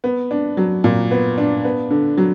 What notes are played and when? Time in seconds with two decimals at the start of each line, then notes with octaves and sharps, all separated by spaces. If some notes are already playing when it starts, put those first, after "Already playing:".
0.04 B3
0.31 D4
0.57 F#3
0.84 A#2
1.11 B3
1.38 D4
1.65 B3
1.90 D3
2.18 F#3